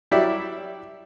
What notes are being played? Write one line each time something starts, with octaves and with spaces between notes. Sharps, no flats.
F#3 G3 E4 G4 D5 E5